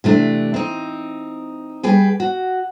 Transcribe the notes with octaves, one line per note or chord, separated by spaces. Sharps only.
C3 E3 A3 D4
C4 D#4
G3 G#4 B4 G5
F#4